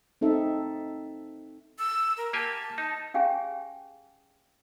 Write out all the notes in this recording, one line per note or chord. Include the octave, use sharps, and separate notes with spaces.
C4 D#4 A4 E5
E6
A#4
A#3 G4 G#5 A5
D#4
C#4 G4 G#4 F5 G5 G#5